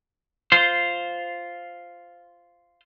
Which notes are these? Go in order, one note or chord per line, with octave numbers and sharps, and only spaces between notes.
F4 C5